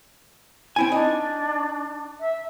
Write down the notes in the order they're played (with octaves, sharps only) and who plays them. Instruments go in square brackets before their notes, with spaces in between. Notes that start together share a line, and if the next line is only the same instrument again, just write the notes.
[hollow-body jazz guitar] C4 E4 G#5
[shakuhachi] D4 [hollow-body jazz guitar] D#4
[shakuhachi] E5